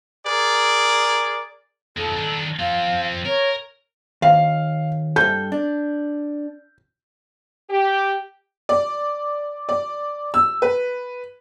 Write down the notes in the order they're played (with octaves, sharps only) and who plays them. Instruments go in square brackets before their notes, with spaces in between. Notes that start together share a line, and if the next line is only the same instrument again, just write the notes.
[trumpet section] G#4 A#4 D5
[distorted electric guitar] F2 D#3 [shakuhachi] A4
[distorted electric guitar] D#3 D4
[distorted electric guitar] F3 C4 [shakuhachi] F5
[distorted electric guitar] A#4 [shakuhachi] C#5
[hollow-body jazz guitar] D#2 [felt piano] F5
[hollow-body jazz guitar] G2 A4 [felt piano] G6
[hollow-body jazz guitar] D4
[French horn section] G4
[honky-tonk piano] D5
D5
E6
B4